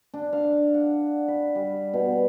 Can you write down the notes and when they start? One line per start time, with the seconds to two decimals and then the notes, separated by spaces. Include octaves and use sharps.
0.14 D4
0.33 F5
0.74 F#5
1.28 B5
1.55 G3
1.93 B2